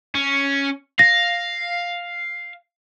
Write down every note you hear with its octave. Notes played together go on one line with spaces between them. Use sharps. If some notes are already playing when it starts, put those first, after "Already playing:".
C#4
F5 A#6